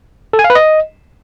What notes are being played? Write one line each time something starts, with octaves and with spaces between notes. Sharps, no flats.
A4
G#5
F5
B4
D#5